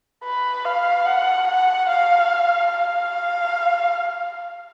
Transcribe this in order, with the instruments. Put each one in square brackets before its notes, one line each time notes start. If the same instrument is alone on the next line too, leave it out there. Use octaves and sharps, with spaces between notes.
[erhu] B4
F5
F#5
F#5
F5
F5